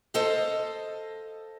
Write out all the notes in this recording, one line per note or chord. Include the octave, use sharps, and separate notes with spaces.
A4 C5 D#5 F5